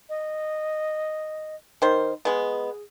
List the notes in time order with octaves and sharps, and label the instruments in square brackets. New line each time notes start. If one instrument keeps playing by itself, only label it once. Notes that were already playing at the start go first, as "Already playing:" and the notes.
[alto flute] D#5
[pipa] D#3 C5 [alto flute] A#4
[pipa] G#3 B3 [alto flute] G#4